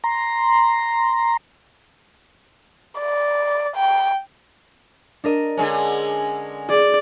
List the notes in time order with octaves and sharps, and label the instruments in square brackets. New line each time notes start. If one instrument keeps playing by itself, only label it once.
[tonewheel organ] A#5 C6
[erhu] D5
G5
[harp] D4 A#4 D#5
[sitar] D3 G#3 C#4
[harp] G#4 [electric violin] D5